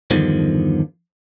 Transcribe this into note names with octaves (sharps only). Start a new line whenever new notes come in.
E2 G2 D3 D#3 F3